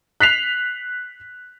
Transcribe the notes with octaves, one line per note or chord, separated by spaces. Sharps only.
F#6 B6 C7 F7